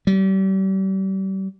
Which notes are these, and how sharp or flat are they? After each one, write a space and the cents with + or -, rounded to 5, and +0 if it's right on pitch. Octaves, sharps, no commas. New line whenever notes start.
G3 -35